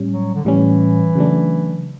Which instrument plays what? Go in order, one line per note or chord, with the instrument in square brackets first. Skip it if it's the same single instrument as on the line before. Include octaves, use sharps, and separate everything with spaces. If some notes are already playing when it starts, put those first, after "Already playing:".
Already playing: [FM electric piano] A2 G3 C#4
[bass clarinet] F#3
D3
[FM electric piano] A2 G3 C#4 [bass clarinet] E3
[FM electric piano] C#3 F#3 A3 D4